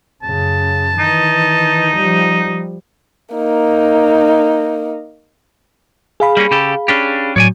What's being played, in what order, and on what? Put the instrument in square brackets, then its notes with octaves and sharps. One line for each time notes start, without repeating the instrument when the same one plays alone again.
[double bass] F#2 C#3 [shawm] A5
[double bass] D#3 E3 [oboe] D#4
[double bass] F3 G3
[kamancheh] A#3 D#4
[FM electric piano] G#4 F5 B5
[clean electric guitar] G3 A#3 C#4
C#3 G4 A4
C#4 D4 G4
[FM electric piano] A2 F#3 [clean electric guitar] C#5 D5 G#5